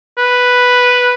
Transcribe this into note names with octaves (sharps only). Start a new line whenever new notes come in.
B4